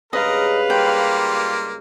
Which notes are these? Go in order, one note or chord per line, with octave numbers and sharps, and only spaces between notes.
G2 C#3 G#3 A#4 B4 D#5 F5
G3 A#3 F4 G5